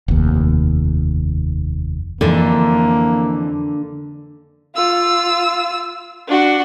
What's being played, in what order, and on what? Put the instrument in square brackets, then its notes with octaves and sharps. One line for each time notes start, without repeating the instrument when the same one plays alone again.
[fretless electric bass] F1 D#2
[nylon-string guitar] F2 E3 [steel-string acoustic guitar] D3 [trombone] A#3
[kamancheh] F4 E6
D4 F#4